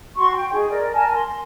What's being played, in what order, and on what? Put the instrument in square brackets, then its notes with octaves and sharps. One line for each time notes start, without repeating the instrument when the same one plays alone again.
[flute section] F#4 C6 C#6
G5
D#4 G#4
A#4 D5
A#4 G#5 A5
C6